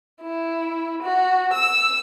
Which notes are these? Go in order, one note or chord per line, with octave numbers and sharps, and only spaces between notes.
E4
F#4
E6